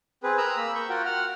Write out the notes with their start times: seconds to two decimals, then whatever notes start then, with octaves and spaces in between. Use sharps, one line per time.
0.23 C4 G#4 B4
0.38 A#4 A#5 D#6 E6 F#6
0.56 A#3 B5 E6
0.75 C#6 G6
0.89 F4 F#4 A#4 F#5 G5
1.05 F#5 F6